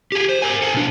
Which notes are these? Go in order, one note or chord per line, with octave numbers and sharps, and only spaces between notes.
G4 G#4
C5
A#4 G#5
A4 G#5
B2 D4